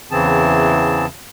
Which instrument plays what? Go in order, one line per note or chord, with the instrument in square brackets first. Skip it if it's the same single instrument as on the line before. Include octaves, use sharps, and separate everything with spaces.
[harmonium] E2 C#3 E3 C4 G#4 A5